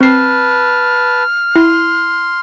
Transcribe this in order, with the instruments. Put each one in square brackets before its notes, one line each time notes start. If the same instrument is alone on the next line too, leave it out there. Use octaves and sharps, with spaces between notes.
[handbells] C4 C7 [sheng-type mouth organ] B4 A5 [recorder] F6
[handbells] E4 [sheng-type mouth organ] C6